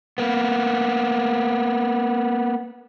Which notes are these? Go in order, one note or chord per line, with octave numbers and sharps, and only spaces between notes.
A#3 B3